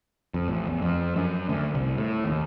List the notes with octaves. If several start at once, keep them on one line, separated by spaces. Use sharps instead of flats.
F2
A1
E2
F2
F#2
D2
C2
A2
D#2